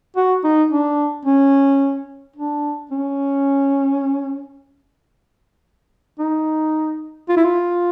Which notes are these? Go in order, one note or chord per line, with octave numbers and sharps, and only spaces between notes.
F#4
D#4
D4
C#4
D4
C#4
D#4
F4
E4
F4